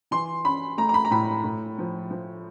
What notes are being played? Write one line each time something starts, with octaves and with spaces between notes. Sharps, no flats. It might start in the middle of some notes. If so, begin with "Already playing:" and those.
E3 C6
C#4 B5
A3 A#5
A#5
B5
A#5
A2 B5
A2
F3
F3